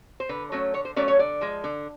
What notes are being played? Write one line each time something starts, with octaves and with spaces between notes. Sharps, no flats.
C5
D3 B4
F#3 A3 C#4
D3 C#5
C5
F#3 A3 C#4 D5
C#5
D3 D5
F3 G#3
D3